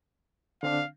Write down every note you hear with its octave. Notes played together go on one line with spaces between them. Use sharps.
D3 C4 D4 F5